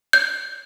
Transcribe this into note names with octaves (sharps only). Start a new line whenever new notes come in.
G6